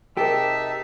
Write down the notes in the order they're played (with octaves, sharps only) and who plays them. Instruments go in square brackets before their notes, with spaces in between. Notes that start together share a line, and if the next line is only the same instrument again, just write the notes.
[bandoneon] C3 D#4 A5 [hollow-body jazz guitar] G4 [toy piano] G#4 A#4 [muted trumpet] E5